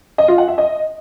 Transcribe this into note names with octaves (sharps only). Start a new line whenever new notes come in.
D#5
F4
F#5
E5
D#5